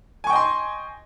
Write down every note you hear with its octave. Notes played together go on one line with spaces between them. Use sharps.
D#5 G5 G#5 C6 C#6